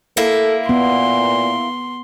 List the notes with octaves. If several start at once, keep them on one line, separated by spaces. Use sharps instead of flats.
A#3 E4 A4
A#2 B3 C6